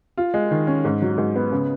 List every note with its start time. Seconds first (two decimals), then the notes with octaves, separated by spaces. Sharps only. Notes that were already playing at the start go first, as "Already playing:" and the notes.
0.17 F4
0.34 G#3
0.51 D#3
0.67 C#4
0.85 G#2
1.02 F#3
1.18 G#2
1.36 B3
1.52 C#3